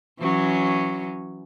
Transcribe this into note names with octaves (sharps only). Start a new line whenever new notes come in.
E3 F#3 C#4